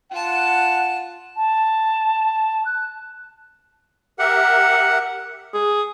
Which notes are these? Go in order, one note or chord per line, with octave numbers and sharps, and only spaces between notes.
F4 F#5 A5
A5
F#6
G4 A#4 E5 F#5
G#4